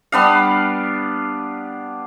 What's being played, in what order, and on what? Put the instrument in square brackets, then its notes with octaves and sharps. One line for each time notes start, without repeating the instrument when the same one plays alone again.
[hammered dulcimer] G3 B3 D4 F5